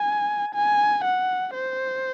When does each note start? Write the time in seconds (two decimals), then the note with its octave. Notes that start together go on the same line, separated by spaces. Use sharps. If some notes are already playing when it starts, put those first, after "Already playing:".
Already playing: G#5
0.55 G#5
1.04 F#5
1.55 C5